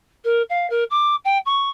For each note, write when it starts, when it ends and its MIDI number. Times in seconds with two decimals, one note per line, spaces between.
0.25 0.42 70
0.50 0.67 77
0.70 0.84 70
0.90 1.16 86
1.25 1.38 79
1.46 1.70 85